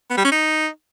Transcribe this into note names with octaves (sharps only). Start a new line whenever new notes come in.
B3
G3
C#4
D#4